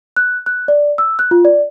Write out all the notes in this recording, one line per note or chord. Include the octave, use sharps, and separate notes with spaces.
F#6
F#6
D5
E6
F#6
F4
D5